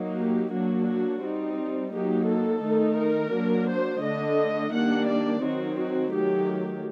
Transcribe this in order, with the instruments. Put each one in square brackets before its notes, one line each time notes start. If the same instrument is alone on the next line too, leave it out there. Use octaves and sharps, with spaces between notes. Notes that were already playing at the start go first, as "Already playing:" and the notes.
Already playing: [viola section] F#3 A#3 D#4
G4
F#3 A#3 D4 F#4
F#4
G3 C4 D#4
F#3 A#3 D#4 G4
A4
D#3 A3 D#4
A#4
F#3 A#3 D4
C5
D3 A3 D4 D#5
D#3 G3 A#3 D4 F#5
D5
D#3 F#3 C4 D#4 F#4
F#4
D#3 F#3 A3 G4